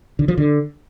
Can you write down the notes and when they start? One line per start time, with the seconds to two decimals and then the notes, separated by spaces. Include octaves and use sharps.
0.19 D3
0.28 F3
0.38 D3